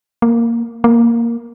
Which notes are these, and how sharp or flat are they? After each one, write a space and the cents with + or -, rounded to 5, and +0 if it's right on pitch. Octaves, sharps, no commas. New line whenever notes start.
A#3 -5
A#3 +0